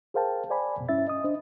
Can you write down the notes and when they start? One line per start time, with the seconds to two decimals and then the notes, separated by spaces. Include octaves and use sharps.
0.14 G#4 A#4 C5 F5 G5 A5
0.50 C5 D5 G#5 B5
0.77 F2 B2
0.89 G2 C#4 E4 E5 A6
1.07 D#5 D#6
1.24 D4 C5 D#5